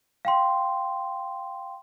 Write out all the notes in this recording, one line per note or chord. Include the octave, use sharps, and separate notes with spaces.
F5 G5 C6